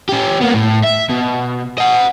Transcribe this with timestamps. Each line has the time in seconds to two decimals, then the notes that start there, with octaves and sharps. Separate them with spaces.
0.09 C#4 G4
0.42 A#3 B3
0.54 A2
0.84 E5
1.10 B2
1.78 D#5 F#5